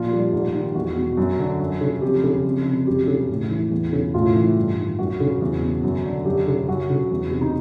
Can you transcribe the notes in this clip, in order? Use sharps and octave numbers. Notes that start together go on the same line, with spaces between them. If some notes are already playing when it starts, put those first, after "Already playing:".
Already playing: A#2 F3 F4
G3
G#2
D#3
E2 F#4
B2
F#2
D3
F#2
C#3
F2 G4
C#3
F2
C3
F#2 G4
C#3
A2
E3
E2
C#3
A2 F4
E3
G2
D#3
F#2 F#4
C#3
E2
B2
F#2
D3
F#2 G4
C#3
F#2 F#4
C#3
E2
C3
D#4